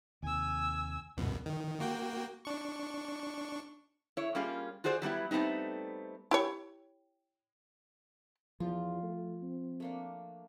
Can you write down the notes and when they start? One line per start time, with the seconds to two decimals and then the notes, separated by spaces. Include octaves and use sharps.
0.23 D#2 C3 G#5 E6
1.17 C#2 F#2 B2
1.46 D#3
1.80 A#3 F#4 G5
2.45 D4 C#6
4.17 E4 C#5
4.35 G3 A#3 C#4 F4 G#4
4.84 F4 F#4 G#4 C5 D5
5.02 F#3 G3 B3 E4
5.31 G3 A3 B3 C4 D#4
6.31 E4 G4 C#5
8.60 E2 F3 F4
9.03 A3
9.42 C4
9.80 A3 A#3 D4